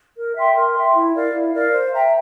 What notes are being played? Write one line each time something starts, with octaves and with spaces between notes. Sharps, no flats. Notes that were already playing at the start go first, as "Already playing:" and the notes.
A#4
E5 G5 C6
A#4
E5 G5 C6
E4
A#4 D5 F5
E4
A#4 D5 F5
C5
E5 G5 A#5